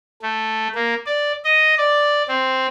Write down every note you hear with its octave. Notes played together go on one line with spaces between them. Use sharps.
A3
A#3
D5
D#5
D5
C4